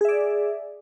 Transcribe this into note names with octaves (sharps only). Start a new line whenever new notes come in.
G#4 D5 E5